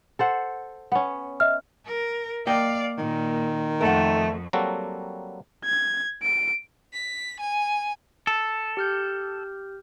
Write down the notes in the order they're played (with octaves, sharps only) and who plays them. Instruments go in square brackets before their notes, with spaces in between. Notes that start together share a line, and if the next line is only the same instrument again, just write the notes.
[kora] A4 C5 F#5
B3 C#4
[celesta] D#5 E5 F6
[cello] A#4
[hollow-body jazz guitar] A#3 D#5 G5 [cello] D5 F5
[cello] A#2 [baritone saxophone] D#3
[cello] F2 [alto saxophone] A3 [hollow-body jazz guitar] A#4 F#5
[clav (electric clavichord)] F#3 G3 A#3 C4 F#4 A4
[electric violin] G#6
D7
[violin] B6
G#5
[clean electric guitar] A4
[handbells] G4 F6 G6